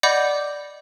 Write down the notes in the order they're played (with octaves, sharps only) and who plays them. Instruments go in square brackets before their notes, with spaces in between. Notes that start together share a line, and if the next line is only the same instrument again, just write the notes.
[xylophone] D5 D#5 F#5 B5 D6 G6